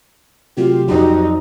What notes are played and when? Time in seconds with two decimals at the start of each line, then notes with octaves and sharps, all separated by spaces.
0.57 C3 F#3 A3 F4 G4
0.88 F2 F#3 D#4 F#4 D5